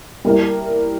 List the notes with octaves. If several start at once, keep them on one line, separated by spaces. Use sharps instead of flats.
G3 A#3 E4 A#4